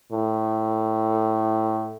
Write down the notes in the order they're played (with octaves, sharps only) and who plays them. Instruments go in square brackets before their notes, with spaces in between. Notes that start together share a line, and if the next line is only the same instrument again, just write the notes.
[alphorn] A2